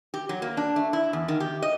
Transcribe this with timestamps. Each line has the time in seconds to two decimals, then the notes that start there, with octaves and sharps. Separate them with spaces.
0.14 G4
0.29 F#3
0.42 A#3
0.57 D4
0.76 A3
0.93 E4
1.13 E2
1.28 D#3
1.40 G4
1.62 D#5